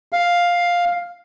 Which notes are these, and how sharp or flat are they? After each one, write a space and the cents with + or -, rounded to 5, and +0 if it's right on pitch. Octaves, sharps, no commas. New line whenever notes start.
F5 +5